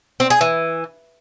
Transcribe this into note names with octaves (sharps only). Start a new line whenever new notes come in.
C4
G#4
E3